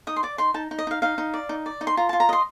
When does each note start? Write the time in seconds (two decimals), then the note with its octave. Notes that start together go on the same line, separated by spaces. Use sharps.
0.07 D#4 D#6
0.16 C6
0.23 D5 D6
0.38 D#4 C6
0.54 D#4 A5
0.71 D#4
0.78 D#5
0.87 D#4 F5
1.02 D#4 F5
1.18 D#4
1.34 D5
1.49 D#4
1.66 D5
1.81 D#4
1.87 C6
1.97 F4 A#5
2.09 A5
2.13 F4
2.20 A#5
2.29 D#5 C6